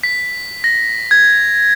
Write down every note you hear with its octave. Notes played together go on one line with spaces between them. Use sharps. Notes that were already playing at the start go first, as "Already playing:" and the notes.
B6
A#6
G#6